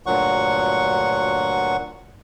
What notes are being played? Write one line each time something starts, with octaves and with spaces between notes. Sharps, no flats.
D2 G2 A#2 F#3 F#5 C#6